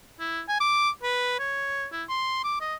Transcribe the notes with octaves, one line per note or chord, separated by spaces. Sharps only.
E4
G#5
D6
B4
C#5
E4
C6
D6
D#5